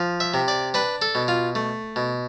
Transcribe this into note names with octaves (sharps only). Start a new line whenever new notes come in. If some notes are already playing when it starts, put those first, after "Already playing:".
Already playing: F3
E5
C3
D5
D4 B4
A4
B2
F4
A3
B2